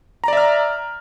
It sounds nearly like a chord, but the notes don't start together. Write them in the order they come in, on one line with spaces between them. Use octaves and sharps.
A#5 D5 E5 F6